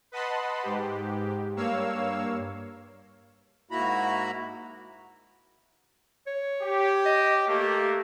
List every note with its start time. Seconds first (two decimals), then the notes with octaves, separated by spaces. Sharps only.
0.12 B4 D#5 F#5 A5 B5 C6
0.63 G#2 G4
1.56 G2 A#3 C#5 F5 E6
3.71 G#2 A#3 E4 F#4 A#5 B5
6.27 C#5
6.63 G4
7.05 D#5
7.48 A3 A#3 G4